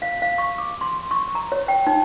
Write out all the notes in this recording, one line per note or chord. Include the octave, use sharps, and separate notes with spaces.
F5
F5
C#6
D6
C6
C#6
A#5
C#5
G5
D#4